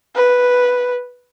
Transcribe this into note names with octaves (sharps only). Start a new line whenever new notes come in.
B4